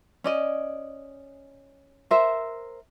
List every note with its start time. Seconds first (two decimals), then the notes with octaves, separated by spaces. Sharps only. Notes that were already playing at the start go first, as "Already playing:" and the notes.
0.24 C#4 D5 D#5
2.11 A#4 C5 E5